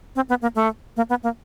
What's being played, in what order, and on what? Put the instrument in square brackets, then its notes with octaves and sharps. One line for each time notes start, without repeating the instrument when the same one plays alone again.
[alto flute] C4
B3
A#3
A3
A#3
B3
A#3